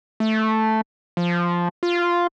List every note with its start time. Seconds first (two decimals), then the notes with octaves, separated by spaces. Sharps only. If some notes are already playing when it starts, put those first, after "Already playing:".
0.20 A3
1.17 F3
1.83 F4